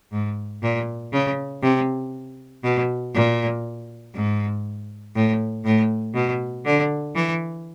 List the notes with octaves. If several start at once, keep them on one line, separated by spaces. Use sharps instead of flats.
G#2
A#2
C#3
C3
B2
A#2
G#2
A2
A2
B2
D3
E3